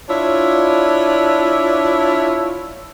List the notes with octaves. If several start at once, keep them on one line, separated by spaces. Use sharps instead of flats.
D4 E4 F4 C#5